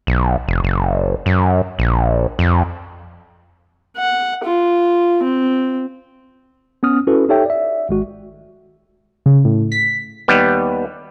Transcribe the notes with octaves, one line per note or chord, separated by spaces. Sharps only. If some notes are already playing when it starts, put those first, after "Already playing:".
B1
F1
F#1
F#2
A#1
F2
F#5
F4
C4
B3 C#4 D#6 F6
C#4 E4 F#4 A4 B4
D#4 G4 A4 C#5 E5 G5
D5 E5
G#1 G#3 F#4
C#3
A2
B6
D#2 G3 B3